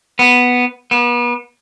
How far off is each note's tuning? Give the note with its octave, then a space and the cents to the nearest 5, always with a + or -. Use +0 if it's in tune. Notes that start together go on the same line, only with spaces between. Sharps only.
B3 +0
B3 -35